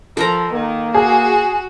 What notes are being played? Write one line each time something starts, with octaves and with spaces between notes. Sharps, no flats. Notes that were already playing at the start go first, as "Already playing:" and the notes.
F3 A4 A#4 A#5
D#3 A#3
F#4 G#4